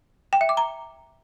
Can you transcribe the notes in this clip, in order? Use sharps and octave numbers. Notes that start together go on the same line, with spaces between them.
G5
E5
D6
A#5